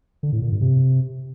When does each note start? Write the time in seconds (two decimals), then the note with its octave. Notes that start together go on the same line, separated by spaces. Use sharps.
0.23 D3
0.33 A2
0.42 A#2
0.52 G2
0.61 C3